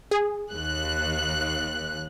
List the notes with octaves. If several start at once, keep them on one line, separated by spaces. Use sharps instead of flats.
G#4
D#2 F#6